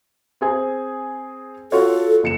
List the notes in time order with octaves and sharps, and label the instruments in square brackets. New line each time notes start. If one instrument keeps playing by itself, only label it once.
[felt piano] C4 G#4 G#5
[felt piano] F4 F#4 C#5 [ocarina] A4
[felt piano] F#1 C#7 E7